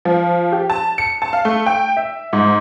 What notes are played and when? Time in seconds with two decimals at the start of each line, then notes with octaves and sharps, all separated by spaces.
0.05 F3
0.52 G4
0.70 A5
0.98 C#7
1.22 A5
1.33 F5
1.45 A3
1.66 G5
1.97 E5
2.33 G#2